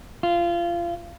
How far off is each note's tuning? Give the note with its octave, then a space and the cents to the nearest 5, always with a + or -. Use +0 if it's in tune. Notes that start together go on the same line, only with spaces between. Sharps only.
F4 -25